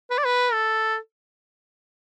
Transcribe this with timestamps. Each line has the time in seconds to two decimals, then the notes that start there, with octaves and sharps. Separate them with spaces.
0.10 B4
0.18 D5
0.25 B4
0.52 A4